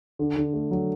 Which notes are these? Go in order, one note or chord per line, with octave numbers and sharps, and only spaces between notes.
D3
D3
A3
F#3